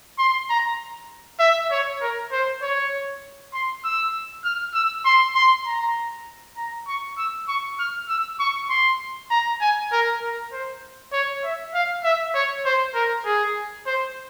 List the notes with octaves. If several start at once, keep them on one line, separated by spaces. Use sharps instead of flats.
C6
A#5
E5
C#5
A#4
C5
C#5
C6
E6
F6
E6
C6
C6
A#5
A#5
C#6
E6
C#6
F6
E6
C#6
C6
A#5
G#5
A#4
A#4
C5
C#5
E5
F5
E5
C#5
C5
A#4
G#4
C5